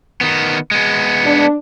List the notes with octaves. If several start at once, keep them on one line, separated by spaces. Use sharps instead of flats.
D#3 B3
G#3 B3
D4